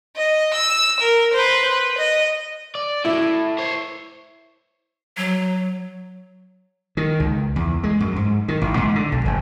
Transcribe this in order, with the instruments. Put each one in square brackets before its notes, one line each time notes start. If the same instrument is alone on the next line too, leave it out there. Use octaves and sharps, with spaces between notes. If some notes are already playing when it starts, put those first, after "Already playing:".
[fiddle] D#5
E6
A#4
B4 C5
B4
D#5
[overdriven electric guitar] D5
[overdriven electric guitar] A2 [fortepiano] E4
[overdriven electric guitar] C5 C#5
[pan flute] F#3
[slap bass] D#3
C#2
E2
G#3
F#2
G#2
D#3
A1
G#2
D3
B1
F#1